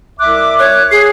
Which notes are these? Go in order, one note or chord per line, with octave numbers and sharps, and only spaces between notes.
C2 E5 D6 F#6
C#5 F#6
G#4 C7